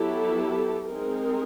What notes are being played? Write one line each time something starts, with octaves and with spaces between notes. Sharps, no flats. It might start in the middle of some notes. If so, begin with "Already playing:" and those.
Already playing: F#3 B3 E4 G4 A4
G#3 C4 D#4 G#4 A#4